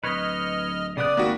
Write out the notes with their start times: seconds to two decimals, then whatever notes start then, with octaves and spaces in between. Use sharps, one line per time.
0.04 D1 B4 C#5 D#5 F6
0.97 C#3 B3 D5 D#6 F#6
1.17 G#1 A#3 F#4 G5 B5 F#6